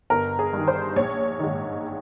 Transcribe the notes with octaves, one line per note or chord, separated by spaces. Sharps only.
G1 A#4
G#4
G2 D#3
C5
A#1 C#5
G#2 D#3